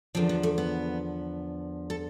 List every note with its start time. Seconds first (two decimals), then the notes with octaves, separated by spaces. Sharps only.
0.15 E2 D3 F3 C4
0.29 B3
0.43 A3
0.58 B3
1.90 A4